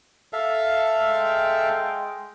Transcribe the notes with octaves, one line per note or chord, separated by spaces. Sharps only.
A4 E5 F5
G#3 G5